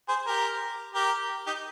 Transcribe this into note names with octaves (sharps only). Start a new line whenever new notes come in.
G#4 C5
G4 A#4
G4 A#4
D#4 G4